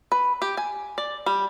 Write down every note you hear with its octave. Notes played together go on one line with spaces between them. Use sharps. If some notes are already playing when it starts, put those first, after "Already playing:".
B4
G4
G#5
D5
G3